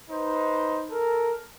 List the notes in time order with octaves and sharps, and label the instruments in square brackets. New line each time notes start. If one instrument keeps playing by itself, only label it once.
[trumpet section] D#4 B4 C5
A4 A#4